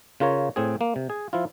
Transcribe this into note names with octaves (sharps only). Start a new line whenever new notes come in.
C#3 F4 A#4 C#5
A2 C4 G#4
A#3
C3
G#4
F3 E4 F4